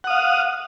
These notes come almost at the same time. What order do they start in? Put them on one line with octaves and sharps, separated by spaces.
F#5 D#6 F5